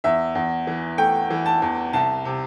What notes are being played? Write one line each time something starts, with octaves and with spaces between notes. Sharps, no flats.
E2 E5
E2
E3
A3 G5
E3
A5
E2
C2 A5
C3